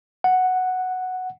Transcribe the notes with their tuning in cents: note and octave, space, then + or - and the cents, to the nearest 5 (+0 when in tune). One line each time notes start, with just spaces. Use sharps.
F#5 +0